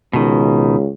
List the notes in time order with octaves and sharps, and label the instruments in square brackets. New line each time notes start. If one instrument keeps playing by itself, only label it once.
[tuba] C#2 [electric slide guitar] B2 D#3